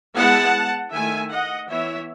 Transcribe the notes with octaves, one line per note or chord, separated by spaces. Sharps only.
G#3 B3 E4 F#5 A5
D#3 A3 E4 E5 G#5
D#5 F#5
E3 B3 E4 C#5 E5